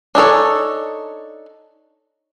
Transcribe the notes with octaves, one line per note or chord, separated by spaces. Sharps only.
D4 D#4 A4 C#5